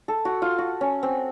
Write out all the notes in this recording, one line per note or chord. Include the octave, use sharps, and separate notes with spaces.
A4
F#4
F4
F#4
C#4
C4